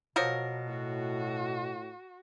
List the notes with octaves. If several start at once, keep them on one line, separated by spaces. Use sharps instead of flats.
B2 F3 F#3 A#4
A2 F#4